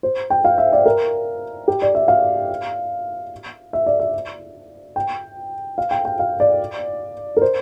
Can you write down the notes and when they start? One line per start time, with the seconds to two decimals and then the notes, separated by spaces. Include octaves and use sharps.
0.03 C5
0.30 G5
0.45 F5
0.58 E5
0.72 D5
0.86 A#4
1.68 G4
1.82 D5
1.95 E5
2.08 F5
3.73 E5
3.86 D5
4.00 E5
4.96 G5
5.78 F5
5.91 G5
6.05 G5
6.19 F5
6.40 D5
7.37 A#4
7.42 C5